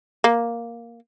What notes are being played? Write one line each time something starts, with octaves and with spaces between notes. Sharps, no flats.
A#3